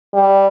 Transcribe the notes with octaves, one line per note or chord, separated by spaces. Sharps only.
G3